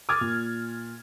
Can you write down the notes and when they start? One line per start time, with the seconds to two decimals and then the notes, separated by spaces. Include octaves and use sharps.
0.09 D6 D#6 F6 G#6 A6
0.21 A#2